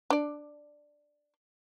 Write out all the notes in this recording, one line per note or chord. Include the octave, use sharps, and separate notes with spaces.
D4 D5